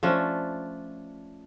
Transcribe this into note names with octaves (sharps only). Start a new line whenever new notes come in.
F3 A3 C#4 D4